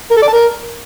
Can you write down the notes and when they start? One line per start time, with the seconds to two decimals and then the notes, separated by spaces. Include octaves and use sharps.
0.11 A#4
0.16 A4
0.22 D5
0.28 A5
0.33 A#4